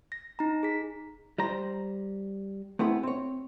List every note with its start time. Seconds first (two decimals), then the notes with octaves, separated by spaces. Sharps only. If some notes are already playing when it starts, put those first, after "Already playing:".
0.12 A#6
0.39 D#4 A#5
0.63 G#4 B6
1.38 G3 C5 A#5
2.79 A3 B3 C4 E4 G#4
3.03 C4 C#5